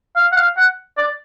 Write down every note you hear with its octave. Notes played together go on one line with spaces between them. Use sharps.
F5
F#5
F5
F#5
D5